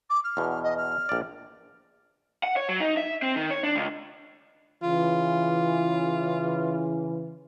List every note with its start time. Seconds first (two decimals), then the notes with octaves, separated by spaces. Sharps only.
0.09 D6
0.23 F6
0.37 E2 B2
0.63 D#5
0.77 F6
1.09 A#1 D5
2.43 F#5
2.57 C#5
2.69 F#3
2.80 D#4
2.97 E5
3.22 C4
3.36 D#3
3.51 C#5
3.63 D4
3.76 C#2
4.83 C#3 E3 F4